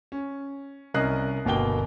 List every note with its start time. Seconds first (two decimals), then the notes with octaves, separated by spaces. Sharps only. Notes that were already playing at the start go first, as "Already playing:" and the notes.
0.12 C#4
0.94 C2 C#4 A#4 D#5 F#6 C7
1.45 G1 B2 A#3 G5 G7